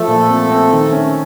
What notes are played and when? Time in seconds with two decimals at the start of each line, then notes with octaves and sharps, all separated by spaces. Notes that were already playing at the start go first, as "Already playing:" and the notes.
Already playing: F3 A3 A4
0.08 A#2
0.30 C4
0.51 C4
0.73 D#3
0.93 C#4